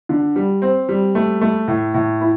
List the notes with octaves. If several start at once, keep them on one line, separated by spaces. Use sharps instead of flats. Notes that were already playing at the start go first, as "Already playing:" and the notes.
D3
G3
C4
G3
A3
A3
A2
A2
E4